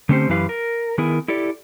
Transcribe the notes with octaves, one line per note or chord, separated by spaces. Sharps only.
D3 A3 C4 C#4 G4 C5
F#2 E3 E4 G4 B4 F5
A#4
D#3 B3 E4 G#4 A#4
E4 G4 A4 D5